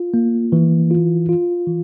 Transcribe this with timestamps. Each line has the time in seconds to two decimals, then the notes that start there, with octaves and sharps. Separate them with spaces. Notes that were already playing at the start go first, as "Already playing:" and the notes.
Already playing: F4
0.14 A#3
0.52 E3
0.91 F4
1.29 F4
1.67 E3